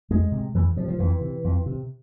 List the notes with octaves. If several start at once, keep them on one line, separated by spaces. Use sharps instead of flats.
F2 G#3
C3
F2 E3
C3 F3
F3
F2 E3
C3
F2
C3